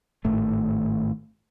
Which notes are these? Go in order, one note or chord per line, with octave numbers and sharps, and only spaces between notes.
G#1 A2 D#3 A3